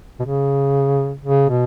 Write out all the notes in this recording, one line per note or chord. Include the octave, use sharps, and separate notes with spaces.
B2
C#3
C#3
B2